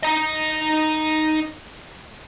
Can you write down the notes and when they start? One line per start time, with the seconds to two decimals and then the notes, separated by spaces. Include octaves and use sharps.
0.03 D#4 D#5